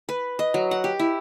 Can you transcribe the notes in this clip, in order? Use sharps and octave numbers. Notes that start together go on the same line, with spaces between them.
B4
D#5
F#3
F#5
G4
E4